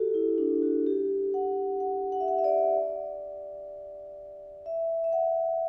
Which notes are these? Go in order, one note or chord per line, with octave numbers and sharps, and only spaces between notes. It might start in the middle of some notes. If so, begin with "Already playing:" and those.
Already playing: F#4 G4 A4
E4
D4
F#4
G4
F#5
F#5
F#5
E5
F#5
E5
D5
E5
E5
F#5